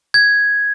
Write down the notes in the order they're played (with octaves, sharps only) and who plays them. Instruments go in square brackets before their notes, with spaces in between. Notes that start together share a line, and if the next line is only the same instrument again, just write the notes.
[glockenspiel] G#6